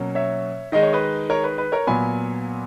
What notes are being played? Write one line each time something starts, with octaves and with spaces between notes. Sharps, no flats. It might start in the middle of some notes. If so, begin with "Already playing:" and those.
Already playing: B2 F#3 A#3 C#4
C#5 E5
D#3 G#3 D#4 D#5
C#5
B4 D#5
A#4 C#5
B4
B4
A#4 C#5
A#2 F#3 B3 G#5 B5